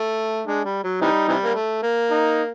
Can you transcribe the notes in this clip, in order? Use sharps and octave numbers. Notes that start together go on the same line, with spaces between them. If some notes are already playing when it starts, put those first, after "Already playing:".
Already playing: A3
G#3 D4
G3
F#3
C3 E3 G3 D#4
C3 E3 G3
A#3
A3
A#3
D#4